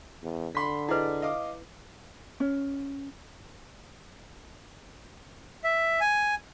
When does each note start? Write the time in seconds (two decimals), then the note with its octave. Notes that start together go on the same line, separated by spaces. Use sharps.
0.23 E2
0.55 D3 B5 C6 B6
0.89 E4 G#4 B4 D5 D#5
1.22 D#5 F5 D6
2.40 C#4
5.64 E5
6.01 G#5